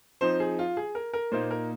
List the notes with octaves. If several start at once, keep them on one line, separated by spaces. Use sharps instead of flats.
F3 C4 D#4 C5
G#4
F4
G#4
A#4
A#4
A#2 A#3 D#4 C5
A#4